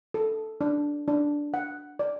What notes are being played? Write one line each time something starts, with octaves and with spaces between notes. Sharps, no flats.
A4
D4
D4
F#5
D5